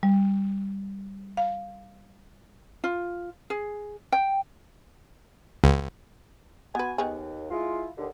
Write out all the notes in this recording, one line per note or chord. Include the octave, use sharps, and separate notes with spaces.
G3
F5
F4
G#4
G5
C#2
B3 F#4 B4 G#5
D#2 D#3 B3 G#4
G#3 E4 F4
D#2 D3